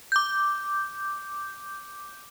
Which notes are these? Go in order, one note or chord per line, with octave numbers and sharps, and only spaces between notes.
D6 G6